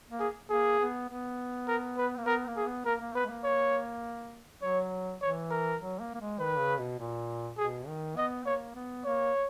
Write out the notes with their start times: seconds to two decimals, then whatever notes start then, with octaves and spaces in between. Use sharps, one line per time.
0.10 A#3
0.20 G#4
0.49 A#3 G#4
0.80 B3
1.09 B3
1.68 A#4
1.97 B4
2.17 A#3
2.26 B3 A#4
2.47 A#3
2.57 G#4
2.67 B3
2.85 A#3 A#4
3.00 A#3
3.15 B3 B4
3.25 G#3
3.30 A#3
3.44 C#5
4.62 F#3 C#5
5.21 E3 C#5
5.51 A#4
5.80 F#3
6.00 A#3
6.14 A#3
6.21 G#3
6.39 D#3 B4
6.59 C#3
6.79 B2
6.99 A#2
7.57 B2 G#4
7.87 D#3
8.16 B3 D#5
8.46 A#3 C#5
8.75 B3
9.05 A#3 C#5